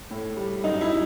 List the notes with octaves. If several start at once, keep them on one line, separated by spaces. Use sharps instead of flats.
A2
G3
F#2 D#4
E4